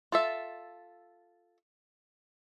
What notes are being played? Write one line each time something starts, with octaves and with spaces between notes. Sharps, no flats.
F4 A4 E5